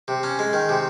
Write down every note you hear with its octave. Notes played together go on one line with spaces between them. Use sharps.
C3
C#4
G#3
D#3
C3